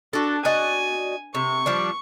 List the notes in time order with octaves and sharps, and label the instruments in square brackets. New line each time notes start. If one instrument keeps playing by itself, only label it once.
[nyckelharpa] D4 [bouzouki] F#4 A4
[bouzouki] F#4 D5 D#5 [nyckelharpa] G#5
[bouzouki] C3 [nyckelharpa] C#6
[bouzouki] F3 G3 D4